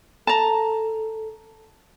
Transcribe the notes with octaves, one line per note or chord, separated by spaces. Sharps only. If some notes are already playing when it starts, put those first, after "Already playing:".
A4 A5 A#5